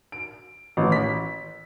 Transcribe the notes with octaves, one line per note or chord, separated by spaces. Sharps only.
D7
A1
B6